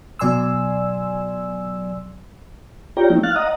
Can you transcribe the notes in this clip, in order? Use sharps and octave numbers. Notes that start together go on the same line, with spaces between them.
B2 F#3 D5 G#5 C6 E6
F4 G4 C#5 D5 G5 A#5
F3 A3 A#3 C#4 D#4 E4
F5 F6 F#6 A6
D#5 F#5 A#5 D#6